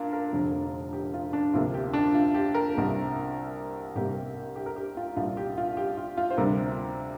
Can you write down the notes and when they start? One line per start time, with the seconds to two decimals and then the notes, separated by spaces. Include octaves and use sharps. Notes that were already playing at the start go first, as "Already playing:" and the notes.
Already playing: A#2 D4 F4 A#4
0.13 A#4
0.33 F1 F2 D3
0.93 G4
1.14 F4
1.33 D4
1.54 D2 C3 F3 A#3 F4
1.74 G4
1.93 D4
2.14 F4
2.34 G4
2.54 A#4
2.75 C2 C3 A#3
3.95 C2 C3 A#3 G4
4.56 G4
4.66 A#4
4.76 G4
4.97 F4
5.16 C2 A#2 G3 F4
5.37 G4
5.57 F4
5.77 G4
5.97 F4
6.17 F4
6.30 C5
6.37 D2 C3 G3 A#4